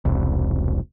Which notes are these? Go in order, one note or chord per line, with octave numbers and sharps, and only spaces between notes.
E1 C2